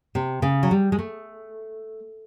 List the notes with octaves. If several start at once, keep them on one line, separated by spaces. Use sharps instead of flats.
C3
C#3
F#3
G3
G#3
A3